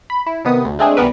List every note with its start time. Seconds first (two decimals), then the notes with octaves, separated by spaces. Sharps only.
0.10 B5
0.27 E4
0.45 C3 D#3 B3 D#6
0.65 D2
0.79 G#3 A3 C4 D4 G#4
0.97 C2 E3 G3 B3 A#4 B4